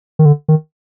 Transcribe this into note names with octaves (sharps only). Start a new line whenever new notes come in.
D#3
D3
D#3